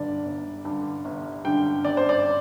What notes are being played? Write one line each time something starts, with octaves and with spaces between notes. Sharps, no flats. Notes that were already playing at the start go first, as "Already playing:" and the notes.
Already playing: G1 G2 D3 D5
G1
G2 D3
G1
G2 D3 G5
G1 D5
C5
D5